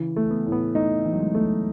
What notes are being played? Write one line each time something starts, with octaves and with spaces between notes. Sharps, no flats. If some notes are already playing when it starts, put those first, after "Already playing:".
Already playing: C#3 E3
A3
B3
A2
B3
A3 D#4
E3
F#3
G#3
A3